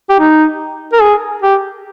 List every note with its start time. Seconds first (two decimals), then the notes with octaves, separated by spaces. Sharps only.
0.09 G4
0.19 D#4
0.93 A#4
1.02 G#4
1.42 G4